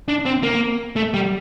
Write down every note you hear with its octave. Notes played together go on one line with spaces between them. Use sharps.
D4
C4
A#3
A3
G3